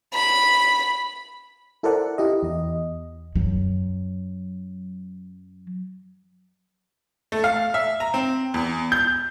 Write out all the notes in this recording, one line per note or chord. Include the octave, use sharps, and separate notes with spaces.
B5
E4 A4 A#4 C5 D5 F#5
E4 G4 D#5
E2 D#5
F#2 F#3
A3
F5
E5
A#5
C4
E2
G6